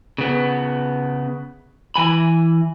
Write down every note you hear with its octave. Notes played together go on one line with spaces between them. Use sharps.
C#3 B3
E3 G#5 B5